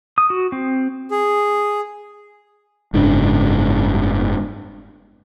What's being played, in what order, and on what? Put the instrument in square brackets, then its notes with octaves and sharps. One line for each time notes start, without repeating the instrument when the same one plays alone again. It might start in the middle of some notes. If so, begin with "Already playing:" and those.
[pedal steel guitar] D#6
F#4
C4
[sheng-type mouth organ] G#4
[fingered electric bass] F#1 G#2 C#3 D4